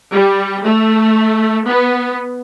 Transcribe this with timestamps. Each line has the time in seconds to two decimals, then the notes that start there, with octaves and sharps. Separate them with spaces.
0.12 G3
0.64 A3
1.67 B3